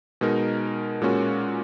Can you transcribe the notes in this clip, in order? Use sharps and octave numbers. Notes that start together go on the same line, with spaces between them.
B2 G#3 D#4 A#4
A#2 G#3 C#4 F#4 A#4